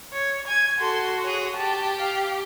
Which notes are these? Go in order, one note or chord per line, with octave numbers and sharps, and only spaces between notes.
C#5
G#5 G#6
F#4 A4 C6
G#4 C#5
G4 A5
F5